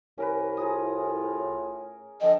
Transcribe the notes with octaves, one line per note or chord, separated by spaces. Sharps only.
C2 C#4 A#4 B4
A2 F4 G#4 A#5 D#6
D3 F3 A4 D#5 G5